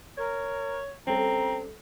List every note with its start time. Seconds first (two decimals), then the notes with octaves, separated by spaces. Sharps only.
0.18 A#4 C#5
1.07 G3 C4 C#4 A4 A#5